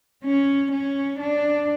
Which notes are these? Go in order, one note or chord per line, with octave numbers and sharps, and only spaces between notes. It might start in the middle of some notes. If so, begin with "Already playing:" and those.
C#4
C#4
D4